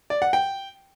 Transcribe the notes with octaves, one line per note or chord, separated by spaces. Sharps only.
D5
F#5
G5